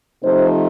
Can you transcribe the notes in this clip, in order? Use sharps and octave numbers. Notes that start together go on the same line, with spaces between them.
C3 F3 A3 D#4 C5